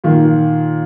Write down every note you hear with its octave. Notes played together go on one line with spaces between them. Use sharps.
A#2 D#3